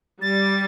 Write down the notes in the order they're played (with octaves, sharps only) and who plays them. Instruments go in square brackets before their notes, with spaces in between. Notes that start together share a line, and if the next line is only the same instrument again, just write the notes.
[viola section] G3 [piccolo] A6